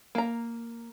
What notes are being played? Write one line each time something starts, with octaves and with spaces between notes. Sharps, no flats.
A#3 A#5